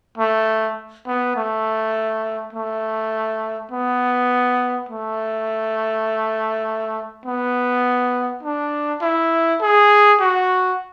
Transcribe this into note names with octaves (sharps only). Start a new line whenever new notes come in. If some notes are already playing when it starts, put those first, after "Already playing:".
A3
B3
A3
A3
B3
A3
B3
D4
E4
G#4
F#4